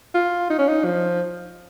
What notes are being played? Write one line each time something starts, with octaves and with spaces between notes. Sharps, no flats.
F4
D#4
C#4
D#4
F3